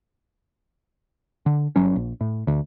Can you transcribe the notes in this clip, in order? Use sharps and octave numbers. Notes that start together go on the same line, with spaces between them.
D3
G1 F#3 C#4
A#1
A2
D2